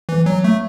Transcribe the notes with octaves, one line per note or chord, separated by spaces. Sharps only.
E3
F#3
A3